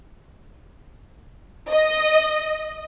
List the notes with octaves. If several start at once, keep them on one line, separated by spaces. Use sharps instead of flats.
D#5